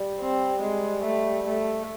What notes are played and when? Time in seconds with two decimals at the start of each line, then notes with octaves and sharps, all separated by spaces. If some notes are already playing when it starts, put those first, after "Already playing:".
Already playing: G3
0.20 C4
0.62 G#3
1.04 A3
1.47 A3